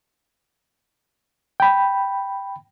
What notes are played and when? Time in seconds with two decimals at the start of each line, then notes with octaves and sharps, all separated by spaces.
1.60 G5 B5